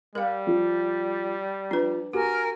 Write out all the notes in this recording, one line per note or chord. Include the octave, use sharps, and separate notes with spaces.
G3 A#4 F5
F3
F3 D4 B4
F#4 G4 A#4 G#5